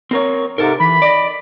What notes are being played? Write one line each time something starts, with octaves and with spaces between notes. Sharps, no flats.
C4 A#4 C#5
G#2 C3 A4 A#4
E3 B5
D5 D#5